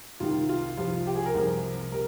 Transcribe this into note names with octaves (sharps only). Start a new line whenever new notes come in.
C2 C3 D#3 F4
F4
C2 C3 F3 F4
G4
G#4
A#4
C2 C3 F3
C3 A#4